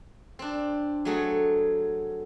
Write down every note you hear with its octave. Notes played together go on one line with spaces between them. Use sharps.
C4 D4
F#3 A3 G#4